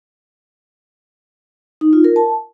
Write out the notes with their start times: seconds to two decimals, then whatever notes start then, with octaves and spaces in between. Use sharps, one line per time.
1.81 D#4
1.93 F4
2.04 A#4
2.16 A5